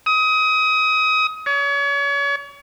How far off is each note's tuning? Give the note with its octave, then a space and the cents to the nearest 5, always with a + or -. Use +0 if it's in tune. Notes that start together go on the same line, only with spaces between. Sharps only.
D#6 +25
C#5 +35